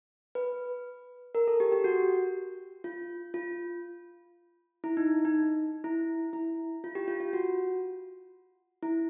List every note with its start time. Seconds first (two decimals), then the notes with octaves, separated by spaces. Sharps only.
0.35 B4
1.35 A#4
1.48 A4
1.60 G4
1.72 G4
1.84 F#4
2.84 F4
3.34 F4
4.84 E4
4.97 D#4
5.25 D#4
5.84 E4
6.33 E4
6.84 F4
6.95 G4
7.08 F4
7.20 F4
7.33 F#4
8.83 E4